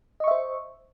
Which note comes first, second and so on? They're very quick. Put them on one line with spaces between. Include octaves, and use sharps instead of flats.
D#5 C#6 E5 C5